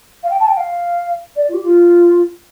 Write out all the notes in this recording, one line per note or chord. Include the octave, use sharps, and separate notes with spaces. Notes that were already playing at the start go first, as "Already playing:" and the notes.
F5
G5
A5
G5
F5
D5
F4
G4
F4